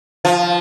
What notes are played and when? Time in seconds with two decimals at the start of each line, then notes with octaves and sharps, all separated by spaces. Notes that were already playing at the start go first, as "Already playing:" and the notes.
0.25 F3